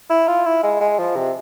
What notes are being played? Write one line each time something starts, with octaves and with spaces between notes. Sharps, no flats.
E4
F4
E4
G#3
G#3
F3
C3